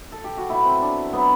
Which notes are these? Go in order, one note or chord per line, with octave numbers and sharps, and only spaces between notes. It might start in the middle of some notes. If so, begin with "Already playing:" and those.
Already playing: B4
A4
G4
F#4
B2 F#3 E4
C4
D4
B2 F#3 B3